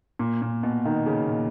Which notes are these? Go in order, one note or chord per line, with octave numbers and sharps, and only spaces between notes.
A#2
A#2
B2
D#3
C#3
A#2